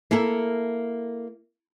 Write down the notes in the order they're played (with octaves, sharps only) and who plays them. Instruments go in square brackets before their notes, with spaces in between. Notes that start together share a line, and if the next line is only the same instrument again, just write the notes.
[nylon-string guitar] A#3 E4 A4 A#4